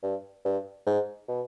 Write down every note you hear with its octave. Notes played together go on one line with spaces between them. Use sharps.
G2
G2
G#2
B2